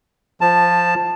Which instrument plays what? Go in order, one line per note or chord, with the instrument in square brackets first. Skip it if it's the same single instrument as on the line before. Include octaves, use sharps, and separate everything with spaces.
[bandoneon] F3 A5